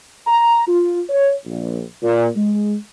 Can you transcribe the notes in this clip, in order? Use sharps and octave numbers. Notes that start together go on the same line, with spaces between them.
A#5
F4
C#5
A#1
A#2
G#3